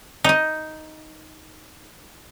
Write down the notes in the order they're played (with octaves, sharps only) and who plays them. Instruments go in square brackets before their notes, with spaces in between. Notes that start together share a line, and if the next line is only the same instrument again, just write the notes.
[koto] D#4 D#5